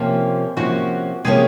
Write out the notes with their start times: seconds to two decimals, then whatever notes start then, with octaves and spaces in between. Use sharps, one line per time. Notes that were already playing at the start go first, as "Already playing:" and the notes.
Already playing: C3 F3 A#3 C#4 F4
0.57 C3 F3 A#3 C#4 F#4
1.25 C3 F3 A#3 C#4 G#4